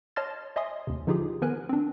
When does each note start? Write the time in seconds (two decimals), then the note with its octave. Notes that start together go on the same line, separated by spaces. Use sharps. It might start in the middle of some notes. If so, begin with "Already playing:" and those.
0.16 C#5 D#5 A5 C6 F6 A6
0.56 C#5 D#5 E5 G#5 C6 D#6
0.87 D#2 C3
1.07 D3 F3 D#4 F4 G4 G#4
1.42 D#3 B3 A#4 B4 G#5 F#6
1.69 C4 D4